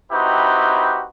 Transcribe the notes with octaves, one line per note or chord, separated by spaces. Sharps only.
C4 D#4 E4 F#4 G4 B4